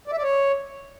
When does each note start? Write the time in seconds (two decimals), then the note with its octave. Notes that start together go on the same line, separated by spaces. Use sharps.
0.08 D5
0.13 E5
0.18 D5
0.23 C#5